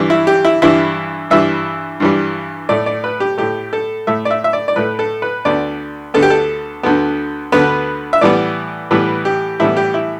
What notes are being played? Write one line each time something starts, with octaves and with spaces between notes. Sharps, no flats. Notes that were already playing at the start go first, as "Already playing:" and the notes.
Already playing: G2 E3 G3
E4
G4
E4
G2 E3 G3 E4
G2 E3 G3 E5
G2 E3 G3
A2 A3 D5
D5
B4
G4
A2 A3 G4
A4
A2 A3 E5
D5
E5
E5
D5
D5
A2 A3 B4
A4
B4
D2 D3 B3 D5
D2 D3 B3 A4
G4
A4
D2 D3 B3
D2 D3 B3 B4
E5
A2 E3 G3 B3 D5
A2 E3 G3 B3 B4
G4
A2 E3 G3 B3 E4
G4
E4